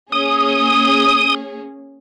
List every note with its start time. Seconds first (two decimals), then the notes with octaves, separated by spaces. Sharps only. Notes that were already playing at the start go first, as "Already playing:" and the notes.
0.12 A#3 C#4 G#4 D#6